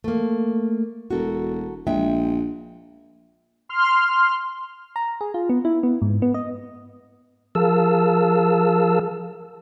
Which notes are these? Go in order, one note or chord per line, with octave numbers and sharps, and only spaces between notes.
A3 A#3
E1 F#4 A4 A#4
A#1 G#3 E5 G5
C6 F6
A#5
G#4
F4
B3
E4
B3
G#2
B3
D#5
F3 G#4 A#4 F5 A5 E6